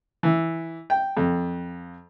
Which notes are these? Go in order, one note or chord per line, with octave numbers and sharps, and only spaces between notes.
E3
G5
F2